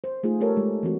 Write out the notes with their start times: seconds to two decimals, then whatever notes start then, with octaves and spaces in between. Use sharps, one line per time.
0.04 C5
0.23 A3 D#4 F4 G#4
0.40 A3 G4 A4 A#4 C#5
0.57 G#3
0.83 E3 C4 F#4